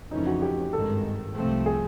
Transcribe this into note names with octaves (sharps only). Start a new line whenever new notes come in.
F2 C#3 E3 A3 C#4 D#4
F#4
G4
G#1 G2 D#3 G#3 A4
C2 C3 F3 A3 C4
G#4